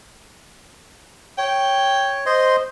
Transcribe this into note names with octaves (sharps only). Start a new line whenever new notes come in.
C#5 G5
C5 D#5 C6